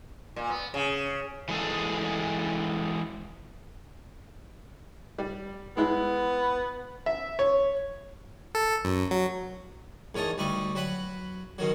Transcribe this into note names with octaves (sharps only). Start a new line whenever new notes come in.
A#2
B3
C#3
E3 G#3 G#4 A4
G3
G#3 B3 E4
E5
C#5
A4
F#2
F#3
E2 D#3 C#5 A5 D#6
D2 G3 D#4 C#6
F#3 B4 F#5
B2 D#3 F#3